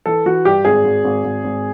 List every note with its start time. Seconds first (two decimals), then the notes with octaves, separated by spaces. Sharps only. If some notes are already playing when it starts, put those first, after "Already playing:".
0.06 E3 A4
0.26 E3 F#4
0.45 G2 G4
0.65 G#1 G#4
0.84 G#1
1.04 G#1
1.24 G#1
1.44 G#1